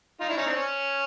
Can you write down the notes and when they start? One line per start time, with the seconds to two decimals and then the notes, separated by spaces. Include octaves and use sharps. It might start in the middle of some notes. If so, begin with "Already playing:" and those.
0.20 D#4 F4
0.29 D4 E4
0.37 C#4 D#4
0.46 C4 D4
0.55 C#4